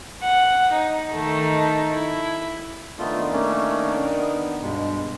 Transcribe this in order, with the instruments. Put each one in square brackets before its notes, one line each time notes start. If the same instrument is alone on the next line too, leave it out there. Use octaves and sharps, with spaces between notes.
[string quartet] F#5
D#4
D#3 A3 D#4
E4
[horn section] D#3 D4 D#4 [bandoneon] A3 B3 F4
[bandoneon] A3 A#3 C#4
B3
G2 B2 G#3